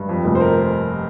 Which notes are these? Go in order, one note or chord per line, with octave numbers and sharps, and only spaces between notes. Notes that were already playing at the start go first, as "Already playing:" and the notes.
Already playing: G2
F2
F1
C5
A#4